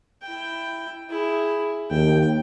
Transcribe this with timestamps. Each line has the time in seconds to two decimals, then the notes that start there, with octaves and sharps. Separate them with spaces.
0.22 E4 G5
1.10 E4 G#4
1.90 D#2 G5